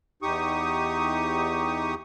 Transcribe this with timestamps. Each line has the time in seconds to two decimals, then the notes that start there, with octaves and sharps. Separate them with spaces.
0.22 E2 D#4 G4 C#6 D#6